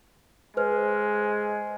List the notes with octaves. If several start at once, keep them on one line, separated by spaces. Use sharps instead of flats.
G#3 B4 C5 F6